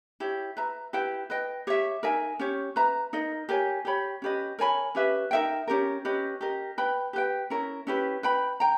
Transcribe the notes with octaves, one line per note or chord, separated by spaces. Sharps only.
E4 G4 C#5
B4 E5 A#5
E4 G4 B4 G5
B4 D#5 G5
G4 C#5 E5
D#4 A#4 E5 G#5
C#4 G4 C#5
B4 E5 A#5
D#4 A#4 D#5
G4 A#4 C#5 G#5
G4 C#5 G5 B5
C#4 G4 B4 D#5
A#4 C#5 G#5 B5
C#4 G4 B4 E5
D#4 A#4 E5 G5
C#4 G4 A#4
C#4 G4 B4 D#5
G4 A#4 D#5
B4 G5 B5
G4 B4 G5
C#4 E4 A#4
C#4 E4 G4 B4
B4 G5 B5
G5 A#5